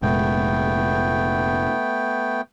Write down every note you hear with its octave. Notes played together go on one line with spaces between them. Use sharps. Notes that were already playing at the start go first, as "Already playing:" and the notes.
F1 A#2 G#3 A3 B3 G5